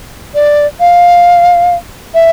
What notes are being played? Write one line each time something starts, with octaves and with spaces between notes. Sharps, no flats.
D5
F5
E5